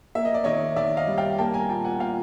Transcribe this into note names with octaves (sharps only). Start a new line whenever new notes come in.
A#3 E5
D#5
D5
D#3 C#5 D#5
D#3 D5 E5
D#5 F5
G3
F5 G5
A#3 G5 A5
G#5 A#5
A#2 G5 A5
F#5 G#5
A#2 F5 G5